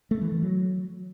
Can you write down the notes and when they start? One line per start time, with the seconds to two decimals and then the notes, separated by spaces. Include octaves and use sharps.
0.11 A3
0.21 E3
0.32 E3
0.42 F#3